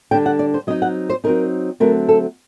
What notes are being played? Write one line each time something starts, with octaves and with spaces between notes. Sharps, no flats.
D3 G3 D4 G5
F#5
D5
C5
F#3 C4 D#4 D#5
F#5
C5
F#3 C4 D#4 A#4
D3 F#3 A3 C4 A#4
A4